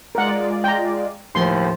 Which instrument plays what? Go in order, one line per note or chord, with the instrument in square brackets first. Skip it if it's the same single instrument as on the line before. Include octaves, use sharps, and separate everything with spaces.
[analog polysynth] G#3 F4 D5 [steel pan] A#4 F#5
[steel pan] G5 A#5
[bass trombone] D#2 [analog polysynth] A2 C5 [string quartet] F3 [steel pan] C6